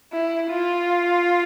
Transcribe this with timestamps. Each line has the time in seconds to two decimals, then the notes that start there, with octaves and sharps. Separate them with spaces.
0.13 E4
0.50 F4